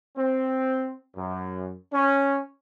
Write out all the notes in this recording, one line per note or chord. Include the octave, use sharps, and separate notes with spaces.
C4
F#2
C#4